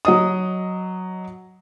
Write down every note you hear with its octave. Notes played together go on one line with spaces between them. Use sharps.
F#3 D#5 D#6